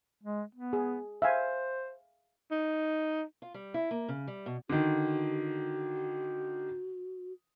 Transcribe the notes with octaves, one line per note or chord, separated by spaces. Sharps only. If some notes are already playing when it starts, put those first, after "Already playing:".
G#3
B3
G#4
C5 E5 F5 G#5
D#4
F4
G3
E4
A#3
C#3
G3
B2
D3 D#3 F#4